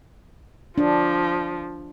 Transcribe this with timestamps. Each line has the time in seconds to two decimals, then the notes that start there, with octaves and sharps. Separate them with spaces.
0.78 F3 D4